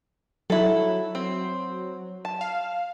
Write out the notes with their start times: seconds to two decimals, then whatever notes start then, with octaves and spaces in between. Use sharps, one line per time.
0.50 F#3 E4 A4
1.15 C4
2.25 A5
2.41 F5